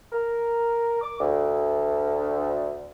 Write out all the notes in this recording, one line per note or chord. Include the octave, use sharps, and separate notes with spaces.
A#4
D6
D2